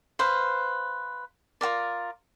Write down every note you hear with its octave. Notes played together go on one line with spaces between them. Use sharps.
B4 C5 F5
F4 F#4 A#4 D5